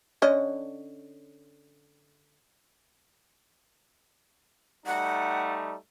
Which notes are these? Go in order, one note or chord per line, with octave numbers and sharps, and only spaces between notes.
D3 C#4 D#5
G3 A3 D#4 F#5